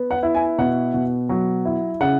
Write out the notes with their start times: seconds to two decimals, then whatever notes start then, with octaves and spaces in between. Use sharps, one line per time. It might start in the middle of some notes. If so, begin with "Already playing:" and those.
Already playing: B3
0.11 F#5
0.23 E4
0.35 G#5
0.58 B2 F#5
0.94 B2
1.29 F#3
1.65 E4
2.01 C#3 F#5